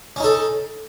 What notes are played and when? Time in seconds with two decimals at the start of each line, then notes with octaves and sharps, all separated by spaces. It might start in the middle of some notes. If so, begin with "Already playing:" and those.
0.16 C#4
0.20 D#4
0.24 A4